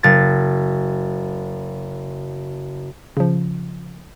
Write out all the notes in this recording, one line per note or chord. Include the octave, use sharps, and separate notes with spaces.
F#1 A6
C#3 F3